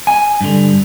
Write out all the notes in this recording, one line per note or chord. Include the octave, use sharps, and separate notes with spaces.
G#5
G2 D3